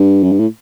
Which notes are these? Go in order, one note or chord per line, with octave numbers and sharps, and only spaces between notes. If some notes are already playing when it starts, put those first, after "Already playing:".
Already playing: G2
F#2
G2
A2